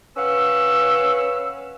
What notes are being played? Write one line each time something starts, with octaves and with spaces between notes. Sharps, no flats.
C#4 B4 F5 F#5 E6